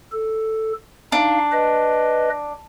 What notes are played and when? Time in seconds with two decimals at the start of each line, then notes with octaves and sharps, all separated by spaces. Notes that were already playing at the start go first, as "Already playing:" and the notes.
0.12 A4
1.12 D4 D#4 F5
1.52 B4 D#5